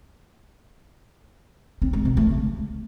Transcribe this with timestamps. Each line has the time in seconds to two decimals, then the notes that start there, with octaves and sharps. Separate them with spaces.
1.82 C4
1.93 G#3
2.05 B2
2.17 A3
2.29 C#3